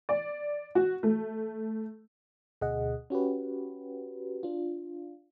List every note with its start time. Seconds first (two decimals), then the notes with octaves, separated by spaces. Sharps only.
0.09 D5
0.75 F#4
1.03 A3
2.61 D2 B2 G#4 D#5 F#5
3.10 C#4 F#4 G4 B4
4.43 D4 F4